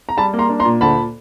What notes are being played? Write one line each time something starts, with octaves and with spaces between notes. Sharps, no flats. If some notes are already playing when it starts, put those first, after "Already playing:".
A#5
G3 A5 B5
A#3
A#5 C6
D4
A#5 C6
A#2
D2 A5 B5